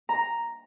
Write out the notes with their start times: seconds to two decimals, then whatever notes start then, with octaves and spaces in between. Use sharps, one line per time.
0.09 A#5